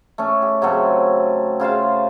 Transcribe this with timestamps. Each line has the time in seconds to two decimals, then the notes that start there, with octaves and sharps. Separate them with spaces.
0.18 A3 C#4
0.42 G4
0.62 C#3 F#3 A3 C4
1.60 C#3 F4 C5 F5